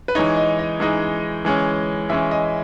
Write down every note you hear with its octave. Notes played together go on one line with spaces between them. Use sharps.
B4
E3 G#3 D#4 C#5
D#5
D#5
E3 G#3 D#4
E3 G#3 C#4
E3 G#3 C#4 E5
D#5